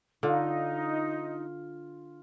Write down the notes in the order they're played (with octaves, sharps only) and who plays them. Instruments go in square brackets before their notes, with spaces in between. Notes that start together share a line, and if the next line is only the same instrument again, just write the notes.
[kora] D3 [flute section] D#4 [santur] F4